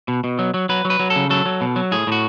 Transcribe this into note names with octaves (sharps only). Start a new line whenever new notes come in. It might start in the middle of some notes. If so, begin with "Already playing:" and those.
B2
B2
F#3
F#3
F#3 B4
F#3
B4
F#3
A4
C#3
F#3 A4
F#3
B2
F#3
A2 G#4
A2 F#4